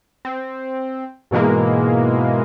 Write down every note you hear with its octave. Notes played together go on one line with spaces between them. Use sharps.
C4
G#2 B2 E3 G#3 A#3